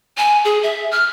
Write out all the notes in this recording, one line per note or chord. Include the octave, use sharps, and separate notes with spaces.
G#5
G#4
E5
F6